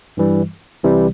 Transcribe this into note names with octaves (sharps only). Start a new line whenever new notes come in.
G2 E3 G3
C2 C3 E3 G3